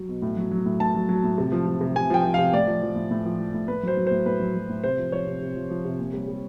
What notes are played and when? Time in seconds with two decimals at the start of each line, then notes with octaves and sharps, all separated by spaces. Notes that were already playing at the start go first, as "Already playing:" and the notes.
Already playing: F#3
0.09 B2
0.22 A2
0.37 F#3
0.52 F#3
0.66 A2
0.80 A2 A5
0.95 F#3
1.09 F#3
1.24 A2
1.38 C3
1.52 F3
1.67 F3
1.81 C3
1.96 C3 G#5
2.10 F3 G5
2.24 F3
2.34 C3 F5
2.53 A2 D5
2.67 F3
2.82 F3
2.96 A2
3.11 A2
3.25 F3
3.39 F3
3.54 A2
3.68 A2 B4
3.83 F#3 C5
3.97 F#3
4.07 A2 C5
4.26 A2 B4
4.40 F#3
4.55 F#3
4.69 A2
4.84 C3 C5
4.98 F3
5.12 F3 C#5
5.27 C3
5.41 C3
5.56 F3
5.70 F3
5.85 C3
5.99 A#2
6.13 G3
6.28 G3